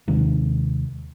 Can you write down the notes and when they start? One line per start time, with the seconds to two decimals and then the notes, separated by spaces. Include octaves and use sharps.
0.08 D#2 C3 D#3 G#3